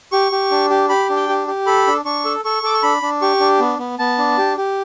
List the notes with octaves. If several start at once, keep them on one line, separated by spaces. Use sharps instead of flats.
G4 C#6
G4
D4
G4
G4 B5
D4
G5
G4
G4
A4 B5
D4
D4 C#6
A4
A4 C#6
A4 D6
C#6
D4 B5
D4
G4 C#6
D4
B3
B3
B3 A5
D4
G4
G4